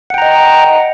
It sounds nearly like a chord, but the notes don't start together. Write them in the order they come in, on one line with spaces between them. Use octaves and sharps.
F#5 G5 A#5 D#5